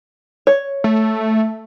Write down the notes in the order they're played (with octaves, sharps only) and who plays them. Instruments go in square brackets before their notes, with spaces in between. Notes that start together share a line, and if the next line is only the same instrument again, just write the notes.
[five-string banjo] C#5
[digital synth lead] A3